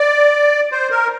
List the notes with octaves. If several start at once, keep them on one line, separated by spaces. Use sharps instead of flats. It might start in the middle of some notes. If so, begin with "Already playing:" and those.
Already playing: D5
C5
A#4